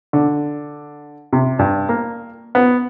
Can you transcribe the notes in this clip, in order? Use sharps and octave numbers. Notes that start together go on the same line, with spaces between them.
D3
C3
G2
A#3
B3